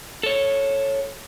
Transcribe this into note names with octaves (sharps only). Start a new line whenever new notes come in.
A4 C#5